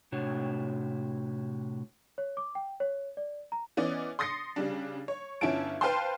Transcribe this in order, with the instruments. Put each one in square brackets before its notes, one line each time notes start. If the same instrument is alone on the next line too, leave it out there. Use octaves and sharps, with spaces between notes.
[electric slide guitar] A2 C3 D4 F#4 C#5
[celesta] C#5
D6
G5
C#5
D5
A#5
[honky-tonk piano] E3 B3 C#4 D5 D#5
C6 D#6 A6 A#6 C7 C#7
C#3 G3 D4
C#5
G1 C#4 E4 F4 A5 D7
B4 C5 F5 G5 A5 C6